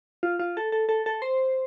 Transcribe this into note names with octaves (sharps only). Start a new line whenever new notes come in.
F4
F4
A4
A4
A4
A4
C5